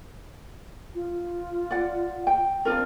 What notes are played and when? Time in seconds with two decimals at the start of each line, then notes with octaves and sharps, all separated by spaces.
0.95 F4
1.71 D5 F#5
2.27 G5
2.65 C4 D4 F4 A#4